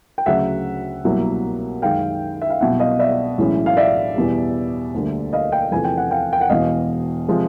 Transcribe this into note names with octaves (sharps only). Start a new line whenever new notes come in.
G5
D2 C#3 F#3 E5 F#5
C2 B2 F#3 A#3
F#2 D#3 G#3 F5 G5
E5
F5
C2 B2 F#3 E5 F#5
D#5 F5
D5 E5
B1 A2 E3 G#3 C#4
F5
D5 E5
E2 B2 G3
D2 D3 G3 A#3
D#5 F5
F5 G5
E2 C3 F3 A3 G#5
G5
F#5
F5 G5
G5
F#5
E1 E2 B2 D#5 F5
C3 F3 G#3